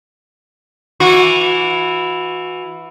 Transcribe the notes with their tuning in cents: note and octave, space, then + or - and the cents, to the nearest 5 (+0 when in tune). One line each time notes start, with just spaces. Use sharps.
E3 +0 F#4 -30